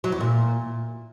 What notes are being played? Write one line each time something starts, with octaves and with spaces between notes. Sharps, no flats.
F#3
E2
A#2